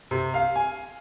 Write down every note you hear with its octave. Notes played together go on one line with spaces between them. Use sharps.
C3
F5
G#5